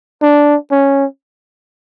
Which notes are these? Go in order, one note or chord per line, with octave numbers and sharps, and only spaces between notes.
D4
C#4